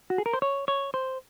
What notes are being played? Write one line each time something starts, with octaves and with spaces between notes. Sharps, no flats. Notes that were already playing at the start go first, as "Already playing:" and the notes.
F#4
G#4
A#4
C5
C#5
C#5
C5